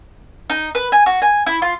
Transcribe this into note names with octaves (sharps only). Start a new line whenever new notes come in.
D#4
B4
G#5
F#4
G#5
E4
F4